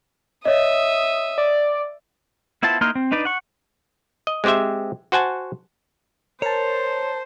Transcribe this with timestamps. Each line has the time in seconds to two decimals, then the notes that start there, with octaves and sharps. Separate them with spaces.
0.45 C#5 D#5 E5 D#6
1.38 D5
2.63 B3 E4 F4 C5 A5
2.81 A#3 D#4 E4 C6 F6
2.95 C4
3.12 D4 D#4 B4 D5
3.25 F#5 C#6
4.27 D#5
4.44 G#3 C4 G4 C5 E5
5.12 F#4 C5 F#5 G#5 A5
6.42 A#4 C5 C#5 A5